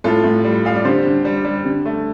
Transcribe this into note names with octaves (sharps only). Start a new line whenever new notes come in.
A2 F4 A4
A2
G3
G3 F5
D5
D3 G4 C5
D3
G3
G3
D3
A3